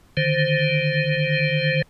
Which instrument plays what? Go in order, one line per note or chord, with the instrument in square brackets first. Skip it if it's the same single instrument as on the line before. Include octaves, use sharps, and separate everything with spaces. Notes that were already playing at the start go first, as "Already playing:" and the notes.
[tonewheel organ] D3 D#3 C5